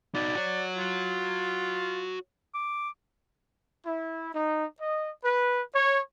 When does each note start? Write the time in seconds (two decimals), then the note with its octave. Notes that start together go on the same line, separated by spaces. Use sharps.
0.15 D#4 F#4 D5
0.35 F#4 C#5
0.76 F4
2.54 D6
3.86 E4
4.34 D#4
4.79 D#5
5.24 B4
5.73 C#5